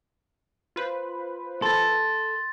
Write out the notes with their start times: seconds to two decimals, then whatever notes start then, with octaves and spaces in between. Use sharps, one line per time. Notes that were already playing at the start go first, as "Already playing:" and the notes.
0.76 F4 B4 C5
1.62 A4 C6 A6